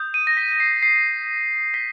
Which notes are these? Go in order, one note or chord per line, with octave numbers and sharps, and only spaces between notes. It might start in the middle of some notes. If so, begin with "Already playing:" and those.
Already playing: D#6 G6
D#7
A#6
B6
C7
C7
B6